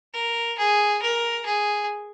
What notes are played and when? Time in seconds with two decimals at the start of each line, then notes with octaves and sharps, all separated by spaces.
0.13 A#4
0.58 G#4
1.02 A#4
1.46 G#4